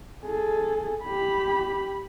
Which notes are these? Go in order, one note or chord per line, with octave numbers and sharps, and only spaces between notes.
G#4 A4
G4 B5